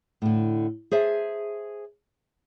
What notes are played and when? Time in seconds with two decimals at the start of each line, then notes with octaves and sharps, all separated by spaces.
0.22 A2 D3
0.91 G#4 C5 E5 A5